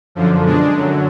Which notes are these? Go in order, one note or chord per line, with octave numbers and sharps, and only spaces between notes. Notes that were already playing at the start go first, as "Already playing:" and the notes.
F#2 D3 F3
B2 G#3 D4
F#2 D3 F#3